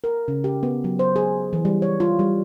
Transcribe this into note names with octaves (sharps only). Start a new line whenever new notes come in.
A#4
C#3
G4
B3
F#3
C5
G#4
E3
G3
C#5
F4
G3